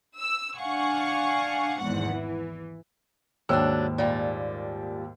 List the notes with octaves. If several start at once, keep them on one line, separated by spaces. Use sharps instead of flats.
E6
D4 F5 F#5 G#5 C#6
G#1 E2 G#2 F#5
E3
D#2 G#2 F#3 G3 D4 E6
A#2 G3